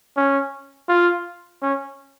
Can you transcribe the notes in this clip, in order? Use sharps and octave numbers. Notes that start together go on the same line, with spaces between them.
C#4
F4
C#4